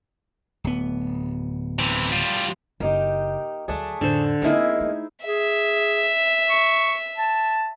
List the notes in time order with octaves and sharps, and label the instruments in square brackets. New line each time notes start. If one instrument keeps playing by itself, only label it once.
[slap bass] D1 B3
[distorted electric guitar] C3 E3
G3 F4
[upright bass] F#1 [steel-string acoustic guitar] A#3 D#4 G4
[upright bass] D2 F#3 [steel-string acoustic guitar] A3 D4 G#4
[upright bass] F2 A2 [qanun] D3 C5
[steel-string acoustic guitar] F2 G#3 A#3 [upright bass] C4 [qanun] D#4 E4 G#4
[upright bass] A3
[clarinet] G#4 [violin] E5
[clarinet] C#6
A5